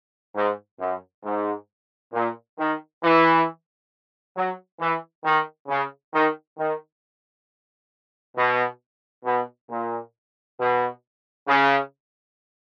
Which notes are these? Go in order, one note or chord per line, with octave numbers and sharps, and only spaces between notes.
G#2
F#2
G#2
A#2
D#3
E3
F#3
E3
D#3
C#3
D#3
D#3
B2
B2
A#2
B2
C#3